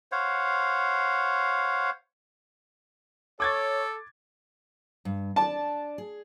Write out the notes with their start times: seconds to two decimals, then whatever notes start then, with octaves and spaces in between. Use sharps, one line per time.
0.12 C5 C#5 F5 F#5
3.40 A4 C#5 D6 G#6 A6
5.05 G2
5.36 D4 D5 A5
5.98 G#4